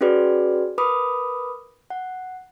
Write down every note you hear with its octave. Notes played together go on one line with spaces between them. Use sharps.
C#4 F#4 G#4 B4 D5
A#4 B4 B5 D6 D#6
F#5